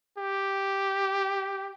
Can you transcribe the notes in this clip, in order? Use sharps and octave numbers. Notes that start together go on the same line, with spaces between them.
G4